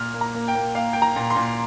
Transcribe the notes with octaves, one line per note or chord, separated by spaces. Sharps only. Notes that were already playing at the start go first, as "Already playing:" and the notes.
Already playing: A#2 F6
A#3
A#5
A#3
G5
A#3
A#3 F5
A#3 G5
A#5
A#2
C6
A#2